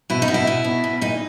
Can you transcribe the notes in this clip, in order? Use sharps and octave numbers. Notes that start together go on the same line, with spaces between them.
B2 E4
D#4
B2
E4
B2
B2
B2
A#2 D#4